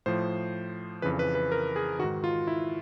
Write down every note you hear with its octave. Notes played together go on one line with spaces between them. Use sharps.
A2 F3 C5
F2 C#3 E3 B4
B4
B4
A#4
G#4
G#2 D#3 F#4
F4
E4